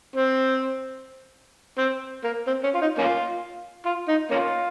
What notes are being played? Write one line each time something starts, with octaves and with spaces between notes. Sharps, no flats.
C4
C4
A#3
C4
C#4
F4
D#4
A#3 C#4 F4
F4
D#4
A#3 C#4 F4